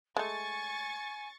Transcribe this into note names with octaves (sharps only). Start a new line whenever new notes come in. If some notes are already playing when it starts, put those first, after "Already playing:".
G#3 A3 G#5 C#6 A6